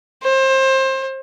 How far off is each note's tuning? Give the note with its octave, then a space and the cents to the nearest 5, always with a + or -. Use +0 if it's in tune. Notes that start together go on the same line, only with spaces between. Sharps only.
C5 +25